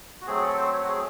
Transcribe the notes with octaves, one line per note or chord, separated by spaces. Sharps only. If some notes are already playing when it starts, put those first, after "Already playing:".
F#4
F#3 A3 C4 G#4
A4
C5
C#5
F#4
G#4